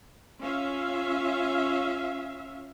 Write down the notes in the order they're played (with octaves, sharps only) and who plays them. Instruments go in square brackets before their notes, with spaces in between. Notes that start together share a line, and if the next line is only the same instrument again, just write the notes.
[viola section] C#4 F4 E5 F5